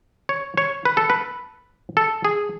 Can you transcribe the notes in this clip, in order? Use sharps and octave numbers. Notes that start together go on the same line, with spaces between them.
C#5
C#5
B4
A4
B4
A4
G#4